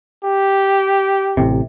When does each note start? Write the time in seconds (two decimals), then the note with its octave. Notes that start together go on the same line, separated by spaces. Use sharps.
0.24 G4
1.37 A1 C3